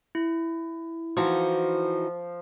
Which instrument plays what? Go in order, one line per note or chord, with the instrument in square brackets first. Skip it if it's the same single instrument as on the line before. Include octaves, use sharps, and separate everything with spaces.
[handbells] E4
[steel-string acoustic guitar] E3 D#4 F#4 [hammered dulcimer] F3